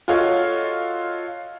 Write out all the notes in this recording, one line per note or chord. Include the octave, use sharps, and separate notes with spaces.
F4 F#4 A4 C#5 D#5 F5